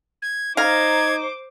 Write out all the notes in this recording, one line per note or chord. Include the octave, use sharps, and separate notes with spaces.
G#6
D#4 C5 F5 A#5 D6 G#6